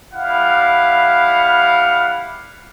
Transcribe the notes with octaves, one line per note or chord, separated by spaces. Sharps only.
G3 E4 F5 F#5